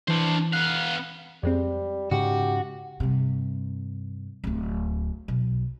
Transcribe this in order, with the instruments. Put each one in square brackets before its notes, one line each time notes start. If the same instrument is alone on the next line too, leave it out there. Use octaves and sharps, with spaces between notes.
[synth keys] E3 [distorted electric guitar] D4 C5
[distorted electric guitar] B3 F5 [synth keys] F#6
[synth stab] F2 G#3 C4 [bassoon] G3
[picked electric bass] G#2 C#3 [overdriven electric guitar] F#4 [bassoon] G4
[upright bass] G2 C3
D1 D2
B1